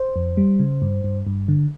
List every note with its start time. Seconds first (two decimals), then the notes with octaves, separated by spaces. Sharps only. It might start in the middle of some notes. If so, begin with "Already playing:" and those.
Already playing: C5
0.16 F2
0.37 G3
0.60 C#3
0.82 G2
1.04 G2
1.27 G2
1.48 D3